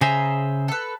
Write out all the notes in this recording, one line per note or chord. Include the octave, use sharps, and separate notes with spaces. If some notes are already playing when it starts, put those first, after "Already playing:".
C#3 G#4 C5 E5 A#5
A4 B4